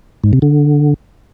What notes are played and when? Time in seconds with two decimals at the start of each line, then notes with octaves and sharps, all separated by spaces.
0.24 G#2
0.33 C3
0.42 D3